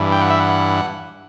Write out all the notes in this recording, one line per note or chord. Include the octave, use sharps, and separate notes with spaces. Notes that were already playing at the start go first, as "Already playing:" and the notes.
Already playing: G2 E3
G5
F#5
E5
F#5